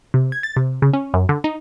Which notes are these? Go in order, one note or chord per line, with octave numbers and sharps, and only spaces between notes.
C3
G#6
A6
C3
C#3
C#4
F#2
D3
D#4